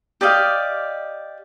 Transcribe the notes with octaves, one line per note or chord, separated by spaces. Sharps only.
G4 D5 D#5 F5